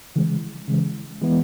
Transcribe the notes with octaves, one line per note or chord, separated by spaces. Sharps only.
C#3 E3 G#3
C#3 E3 G#3
E3 G#3 B3 E4